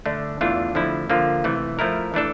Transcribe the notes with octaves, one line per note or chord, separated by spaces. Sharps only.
D3 A3 D4
E2 E3 A3 D4 F4
E2 D3 F3 A3 E4
D3 F3 A#3 D4 F4
C3 E3 A3
F3 A3 E4 A#4
E3 A3 D4 A4